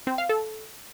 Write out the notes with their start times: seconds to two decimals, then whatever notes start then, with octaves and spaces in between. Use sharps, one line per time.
0.07 C4
0.18 F5
0.29 A4